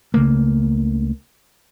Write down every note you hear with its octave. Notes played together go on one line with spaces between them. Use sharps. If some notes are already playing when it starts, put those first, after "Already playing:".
C#2 C#3 A3 A#3